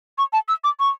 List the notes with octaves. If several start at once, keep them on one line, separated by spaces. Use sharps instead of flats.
C#6
A5
E6
D6
C#6